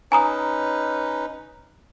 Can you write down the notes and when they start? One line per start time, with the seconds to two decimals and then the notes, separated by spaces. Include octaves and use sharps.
0.12 C#4 D#4 B4 G#5 A#5 D#6